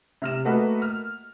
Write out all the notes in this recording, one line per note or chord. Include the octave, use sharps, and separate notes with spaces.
C3 F6 E7
A3 A#3 F#4 B4 D#5 F#5
F6